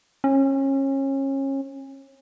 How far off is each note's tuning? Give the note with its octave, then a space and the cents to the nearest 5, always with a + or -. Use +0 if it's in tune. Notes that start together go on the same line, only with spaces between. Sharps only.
C#4 -30